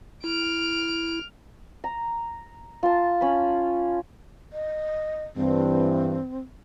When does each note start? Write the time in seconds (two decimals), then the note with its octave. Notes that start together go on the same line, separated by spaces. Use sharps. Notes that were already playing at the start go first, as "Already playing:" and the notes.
0.24 E4 F6 D7
1.84 A#5
2.83 F4 A5
3.21 C#4 B5
4.53 D#5
5.36 G2 E3 C4